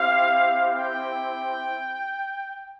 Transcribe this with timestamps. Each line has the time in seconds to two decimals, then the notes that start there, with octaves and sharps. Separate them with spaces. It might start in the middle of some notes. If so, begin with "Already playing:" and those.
Already playing: C4 E4 G4 F5
0.79 G5